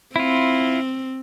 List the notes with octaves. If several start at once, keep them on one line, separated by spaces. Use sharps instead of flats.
C4 E4 F4